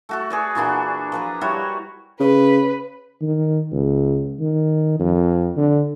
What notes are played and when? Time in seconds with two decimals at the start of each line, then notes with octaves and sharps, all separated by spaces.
0.09 A3 F#4 A4
0.30 G#4 B4 D5
0.55 A#2 E3 D4 F#4
1.12 F3 B4 A#5
1.41 G3 E4 F#4 C#5
2.20 C#3 B4
3.22 D#3
3.72 C#2
4.40 D#3
5.00 F2
5.57 D3